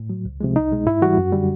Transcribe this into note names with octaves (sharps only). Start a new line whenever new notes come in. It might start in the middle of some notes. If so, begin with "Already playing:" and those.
Already playing: A2
F#3
C#2
C3 F3 G#3
C2 D#4
B2 G#3
G#2 E4
E3 G3 F#4
F#2
D3 G3